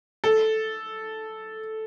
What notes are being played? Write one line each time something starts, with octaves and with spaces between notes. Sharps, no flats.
A4